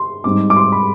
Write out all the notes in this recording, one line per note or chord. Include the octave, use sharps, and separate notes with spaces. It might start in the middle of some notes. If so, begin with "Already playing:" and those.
Already playing: C6
G#2 G3 C4 D#4 D6
D6
C6
B5